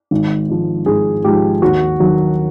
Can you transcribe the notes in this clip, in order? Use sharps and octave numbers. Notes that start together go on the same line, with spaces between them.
G#1
G#2 F3
G#1 G#4
G#2 F3 G4
D#2 F#4
D#3 F#3